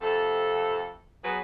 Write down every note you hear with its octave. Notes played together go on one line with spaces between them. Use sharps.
F2 C3 A4
F#3 B3 G#4 B4